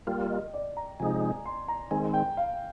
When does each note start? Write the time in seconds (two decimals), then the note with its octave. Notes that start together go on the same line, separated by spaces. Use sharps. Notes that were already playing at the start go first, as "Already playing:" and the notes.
0.07 G3 A#3 F4 G5
0.30 D#5
0.54 D5
0.77 A#5
1.00 C3 F3 G#3 D#4 G#5
1.22 G#5
1.46 C6
1.68 A#5
1.91 D#3 G#3 C4 G#5
2.13 G5
2.37 F5